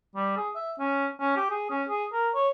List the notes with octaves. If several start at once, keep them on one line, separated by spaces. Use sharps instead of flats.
G3
G#4
E5
C#4
C#4
G4
G#4
C#4
G#4
A#4
C#5